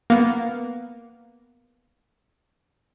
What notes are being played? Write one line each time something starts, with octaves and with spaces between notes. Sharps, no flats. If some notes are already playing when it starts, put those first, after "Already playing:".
A#3 B3